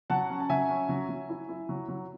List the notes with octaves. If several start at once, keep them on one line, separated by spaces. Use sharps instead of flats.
F#3 F#5 A5
C#4
A5
F#3 E5 G#5
C#4
F#3
F#3
E4
E4
F#3
F#3